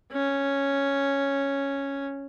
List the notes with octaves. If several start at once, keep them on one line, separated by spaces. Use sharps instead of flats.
C#4